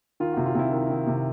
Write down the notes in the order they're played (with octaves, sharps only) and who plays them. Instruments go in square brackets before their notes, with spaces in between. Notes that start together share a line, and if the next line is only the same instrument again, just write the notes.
[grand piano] D#3 F4
C3 F#4
F4
C3 E4
D#3
D#3
C3